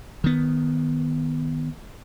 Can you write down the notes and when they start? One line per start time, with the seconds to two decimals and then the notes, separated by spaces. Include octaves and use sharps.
0.24 D#3 B3